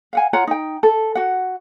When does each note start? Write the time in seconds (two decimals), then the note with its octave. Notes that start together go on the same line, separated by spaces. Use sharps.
0.13 F5 F#5 G#5
0.33 F4 C#5 F#5 A#5
0.47 D#4 G5
0.83 A4
1.15 F#4 F#5